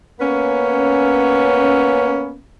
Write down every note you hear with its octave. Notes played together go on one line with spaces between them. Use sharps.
A#3 B3 C#4